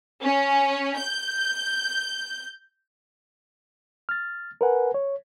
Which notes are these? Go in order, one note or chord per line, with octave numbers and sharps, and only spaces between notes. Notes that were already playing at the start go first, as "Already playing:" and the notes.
C#4
G6
F6 A6
A#4 B4 F#5 G#5
C#5